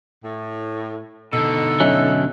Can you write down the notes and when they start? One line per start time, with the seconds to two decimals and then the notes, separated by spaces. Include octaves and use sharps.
0.24 A2
1.33 B2 D3 D#4 A4 E6
1.80 F#3 C#4 D#5 E5 F#6